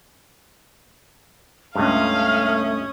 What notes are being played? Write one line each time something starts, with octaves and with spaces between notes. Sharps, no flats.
C#2 G2 A3 C#4 F5 D#6